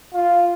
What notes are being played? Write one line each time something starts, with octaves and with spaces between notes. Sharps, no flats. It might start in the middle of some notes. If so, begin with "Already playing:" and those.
F4